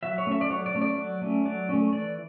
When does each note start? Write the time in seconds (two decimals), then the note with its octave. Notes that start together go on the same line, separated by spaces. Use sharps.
0.03 F#3 E5
0.18 C#5
0.26 A3 C#4
0.31 E5
0.41 D5
0.50 F#3 C#5
0.66 D5
0.74 A3 C#4
0.81 D5
0.97 F#3
1.22 A3 C#4
1.45 F#3 D5
1.69 A3 C#4
1.93 E3 D5